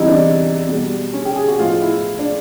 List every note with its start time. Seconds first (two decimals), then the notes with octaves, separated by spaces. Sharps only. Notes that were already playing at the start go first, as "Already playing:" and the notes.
Already playing: E2 C3 E3 G3 D#4 E4
0.08 D4
0.68 B2
0.73 G3
1.14 C#4
1.25 G4
1.36 G#4
1.48 F#4
1.59 A2 F3 G#3 F4
1.82 E4
2.19 D4